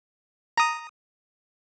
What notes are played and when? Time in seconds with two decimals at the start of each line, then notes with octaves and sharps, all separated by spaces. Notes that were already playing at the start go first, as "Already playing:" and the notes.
0.57 A#5 D#6